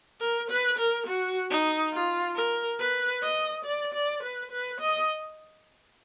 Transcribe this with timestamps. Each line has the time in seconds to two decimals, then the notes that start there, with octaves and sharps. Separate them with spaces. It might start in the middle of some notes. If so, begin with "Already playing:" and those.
0.21 A#4
0.50 B4
0.79 A#4
1.07 F#4
1.51 D#4
1.93 F4
2.36 A#4
2.79 B4
3.23 D#5
3.65 D5
3.94 D5
4.23 B4
4.51 B4
4.80 D#5